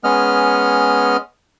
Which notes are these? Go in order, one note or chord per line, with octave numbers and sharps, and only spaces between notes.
G#3 B3 C#4 D#5 F6